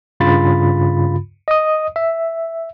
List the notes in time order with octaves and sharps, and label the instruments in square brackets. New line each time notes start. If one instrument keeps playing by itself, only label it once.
[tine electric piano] G2 C#3 F4 B5 A6
D#5 D#6
E5